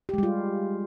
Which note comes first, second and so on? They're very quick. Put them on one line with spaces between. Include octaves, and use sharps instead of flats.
G4 G#3 G3 F4